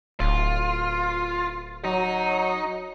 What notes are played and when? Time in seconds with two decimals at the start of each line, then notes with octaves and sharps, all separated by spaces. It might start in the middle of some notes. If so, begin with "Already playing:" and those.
0.20 D1 F4
1.84 F#3 D#4